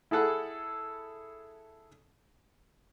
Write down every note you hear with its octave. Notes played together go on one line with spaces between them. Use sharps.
E4 G#4 A4 F#5 B5